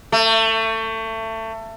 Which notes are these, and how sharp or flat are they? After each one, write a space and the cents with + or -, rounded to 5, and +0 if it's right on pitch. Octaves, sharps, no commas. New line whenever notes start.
A3 +25